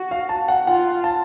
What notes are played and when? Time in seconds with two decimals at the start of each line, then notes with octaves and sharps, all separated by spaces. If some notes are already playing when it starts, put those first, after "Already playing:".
Already playing: F#4
0.11 F5
0.29 A5
0.48 F#5
0.67 F4 F#5
1.04 A5